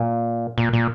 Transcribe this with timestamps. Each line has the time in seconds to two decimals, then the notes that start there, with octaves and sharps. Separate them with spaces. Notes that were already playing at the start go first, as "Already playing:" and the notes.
Already playing: A#2
0.58 A#2
0.73 A#2